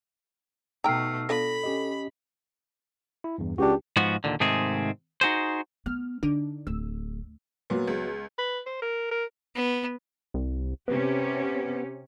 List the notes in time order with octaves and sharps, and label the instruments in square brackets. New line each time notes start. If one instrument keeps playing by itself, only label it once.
[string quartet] B2 A3 [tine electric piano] D#4 [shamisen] G5 A#5 [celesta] E6 F6 C7
[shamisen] B3 D4 F4 [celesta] A4 [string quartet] B5 [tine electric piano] A#6
[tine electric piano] C#4 G4 D#5
E4
E2 G2
[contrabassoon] C#2 [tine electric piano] D4 F#4 [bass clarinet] G4
[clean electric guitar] G#2 F3 B3 F#4
D#2 A#2 D3
G#2 C3 D#3 A3 C4 G#4
D#4 F#4 G#4 C5
[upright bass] B3 [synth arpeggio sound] F6
[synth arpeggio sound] D3 D4 [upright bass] D#4
[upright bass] D1 [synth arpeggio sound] E6
[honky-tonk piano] A#2 [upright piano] F#3 B3
[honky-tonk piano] C#2
[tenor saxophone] B4
C5
A#4
A#4
[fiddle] B3
[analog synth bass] C2
[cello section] C3 C#4 G4 [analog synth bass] B3